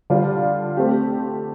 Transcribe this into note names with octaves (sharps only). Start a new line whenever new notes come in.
D3 G3 D4 F4
A3 C4 G4